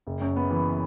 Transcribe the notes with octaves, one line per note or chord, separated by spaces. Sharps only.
F#1
F#2
B3
E3